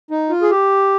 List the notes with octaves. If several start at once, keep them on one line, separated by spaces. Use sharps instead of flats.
D#4
F4
G#4
G4